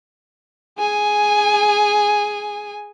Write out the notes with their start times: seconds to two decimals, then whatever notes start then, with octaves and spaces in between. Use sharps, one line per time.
0.78 G#4 G#5